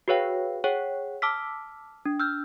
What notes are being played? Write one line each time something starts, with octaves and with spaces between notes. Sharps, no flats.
F#4 G#4 B4 C#5 F5 G5
G#4 C#5 F#5 G5
A5 D6 E6 F6 B6
D4
E6 F6 G6